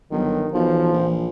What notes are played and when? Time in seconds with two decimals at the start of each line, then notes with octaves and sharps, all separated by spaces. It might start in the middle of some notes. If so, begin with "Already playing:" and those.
0.11 G1 D#3 F#3
0.53 B1 E3 F3
0.92 A#1